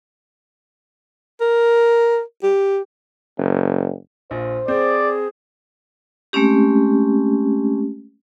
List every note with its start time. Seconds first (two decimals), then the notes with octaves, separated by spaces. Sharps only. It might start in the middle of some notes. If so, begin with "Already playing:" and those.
1.41 A#4
2.43 G4
3.39 F#1
4.31 A#1 F4 C5
4.68 C4 G#4 D5
6.33 G#3 A3 C4 C#4 G4